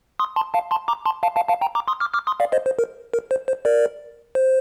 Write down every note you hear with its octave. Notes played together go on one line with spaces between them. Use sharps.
C6 D#6
A5 C6
F5 A5
A5 C6
A#5 D6
A5 C6
F5 A5
F5 A5
F5 A5
G5 A#5
A#5 D6
C6 D#6
D6 F6
D6 F6
C6 D#6
D5 F5
C5 D#5
C5
A#4
A#4
C5
C5
A#4 D5
C5